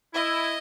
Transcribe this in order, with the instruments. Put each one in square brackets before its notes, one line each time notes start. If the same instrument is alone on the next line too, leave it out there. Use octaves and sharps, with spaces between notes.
[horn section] E4 [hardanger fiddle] D#5